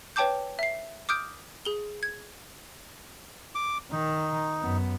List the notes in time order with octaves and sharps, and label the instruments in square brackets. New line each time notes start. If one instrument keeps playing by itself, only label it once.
[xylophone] B4 C#5 G5 A5 D6 G6
E5 C7
D6 D#6 F6 G6 D7
G#4 G7
G#6
[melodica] D6
[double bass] D#3 [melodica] D#4
[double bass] F#2 B3